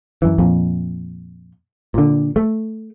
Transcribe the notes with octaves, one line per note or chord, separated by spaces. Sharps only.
F#2 E3
F2 A#2
A#2 D3
A3